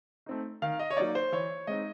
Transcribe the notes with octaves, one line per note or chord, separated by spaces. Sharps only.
A3 C4 D#4
D#3 F5
D#5
C#5
F#3 A#3 D#4 D5
C5
E3 C#5
G#3 C4 D#4 D#5